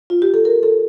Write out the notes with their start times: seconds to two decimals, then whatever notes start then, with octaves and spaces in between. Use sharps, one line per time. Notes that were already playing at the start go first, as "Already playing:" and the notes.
0.10 F4
0.22 G4
0.34 A4
0.45 A#4
0.63 A4